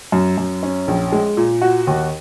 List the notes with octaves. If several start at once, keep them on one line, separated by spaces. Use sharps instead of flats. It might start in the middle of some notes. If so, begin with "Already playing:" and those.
F#2
F#2
C#4
A#1
G#3
A#2
F#4
D#2